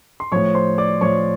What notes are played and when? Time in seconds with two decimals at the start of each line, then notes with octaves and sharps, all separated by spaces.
0.20 C6
0.32 A2 F3 C#5 C#6
0.55 C5 C6
0.78 D5 D6
1.01 A2 F3 C#5 C#6